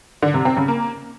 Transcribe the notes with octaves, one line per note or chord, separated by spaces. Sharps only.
D3
C3
C4
C#3
A#3